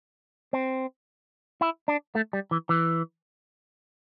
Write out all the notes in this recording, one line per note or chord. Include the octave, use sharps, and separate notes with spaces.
C4
E4
D4
A3
G3
E3
E3